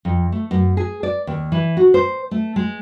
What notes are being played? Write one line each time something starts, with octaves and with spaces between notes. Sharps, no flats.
F2
A3
F#2
G#4
D5
D#2
E3
F#4
C5
A3
G#3